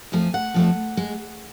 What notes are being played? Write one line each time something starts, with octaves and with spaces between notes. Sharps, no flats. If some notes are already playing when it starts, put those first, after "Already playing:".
F2 F3 A3 G#5
F#5
F2 F3 A3
G#3